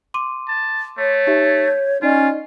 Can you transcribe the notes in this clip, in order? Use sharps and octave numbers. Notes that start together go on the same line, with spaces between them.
C6 D6 D#7
A5
A3 C#5
D#4 G4 E5
G6
C#4 D#4 F4 D5 D#5